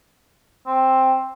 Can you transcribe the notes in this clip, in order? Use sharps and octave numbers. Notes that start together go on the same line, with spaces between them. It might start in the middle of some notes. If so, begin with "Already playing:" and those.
C4